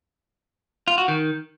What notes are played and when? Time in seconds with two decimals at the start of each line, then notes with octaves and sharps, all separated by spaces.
0.88 F4
0.98 F#4
1.08 D#3